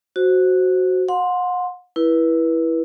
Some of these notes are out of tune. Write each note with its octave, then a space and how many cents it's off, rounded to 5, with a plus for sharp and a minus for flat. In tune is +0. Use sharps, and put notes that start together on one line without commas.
F#4 +0 C5 +0
F#5 -40 C6 +0
E4 +0 B4 -30